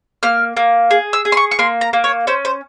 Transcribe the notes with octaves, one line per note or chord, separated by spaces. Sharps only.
A#3 F6
A#3
G#4
E6
G#4
C6
C#6
C#6
A#3 C6
A#5
A#3
C#5
C#4 C5
C5